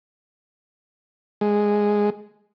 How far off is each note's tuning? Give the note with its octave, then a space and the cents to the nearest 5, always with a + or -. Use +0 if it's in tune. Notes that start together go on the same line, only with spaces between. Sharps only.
G#3 -5